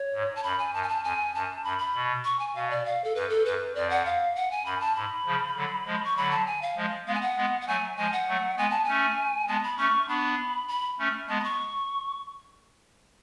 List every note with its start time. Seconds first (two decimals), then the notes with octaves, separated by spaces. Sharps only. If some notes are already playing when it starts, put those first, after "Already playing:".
Already playing: C#5
0.14 G#2
0.35 A5
0.43 F#2 B5
0.59 G#5
0.73 F#2 A5
0.83 G#5
0.89 A5
1.04 F2 G#5
1.35 F#2 A5
1.64 F#2 B5
1.79 B5
1.94 B2
2.25 C#6
2.39 G#5
2.55 B2 F5
2.70 D5
2.86 F5
3.04 A4
3.15 F#2 B4
3.30 A4
3.45 F#2 B4
3.75 F2 D5
3.90 F#5
4.05 F5
4.36 F#5
4.51 G#5
4.65 F#2 B5
4.81 A5
4.95 G#2 B5
5.26 C#3 F3
5.56 D3 F#3
5.86 F3 G#3
6.04 C#6
6.16 D3 F#3 B5
6.31 A5
6.46 G#5
6.62 F5
6.76 F3 G#3
7.07 G#3 B3 F5
7.15 G#5
7.21 F#5
7.37 G#3 B3
7.61 F#5
7.67 F#3 A3 G#5
7.97 F3 G#3 G#5
8.12 F#5
8.28 F#3 A3
8.57 G#3 B3 G#5
8.71 A5
8.84 A3 C#4 G#5
9.47 G#3 B3 A5
9.64 B5
9.77 A3 C#4 C#6
10.08 B3 D4 B5
10.68 B5
10.99 A3 C#4
11.28 G#3 B3 A5
11.39 B5
11.44 C#6